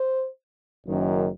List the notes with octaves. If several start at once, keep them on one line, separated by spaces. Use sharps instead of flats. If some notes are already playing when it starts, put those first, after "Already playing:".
Already playing: C5
F#1 F#2 D#3